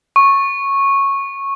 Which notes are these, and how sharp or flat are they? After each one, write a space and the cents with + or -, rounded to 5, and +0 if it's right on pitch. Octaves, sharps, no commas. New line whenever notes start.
C#6 -10